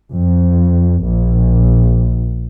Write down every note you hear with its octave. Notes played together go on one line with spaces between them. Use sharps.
F2
A#1